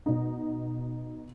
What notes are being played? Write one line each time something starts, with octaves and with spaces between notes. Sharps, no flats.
B2 D#4